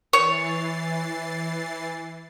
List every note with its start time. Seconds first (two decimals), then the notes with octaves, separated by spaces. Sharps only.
0.13 E3 C#5 A6 C7